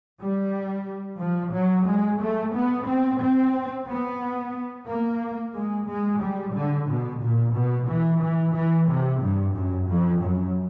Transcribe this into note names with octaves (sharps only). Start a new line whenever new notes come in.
G3
F3
F#3
G#3
A3
B3
C4
C4
B3
A#3
G#3
G#3
G3
D3
B2
A#2
B2
E3
E3
E3
C3
G2
F#2
F2
F#2